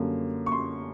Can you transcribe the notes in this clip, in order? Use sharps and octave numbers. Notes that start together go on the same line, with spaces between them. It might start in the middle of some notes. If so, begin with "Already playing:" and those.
Already playing: F#2 D3 G3 A#3
C#6
C6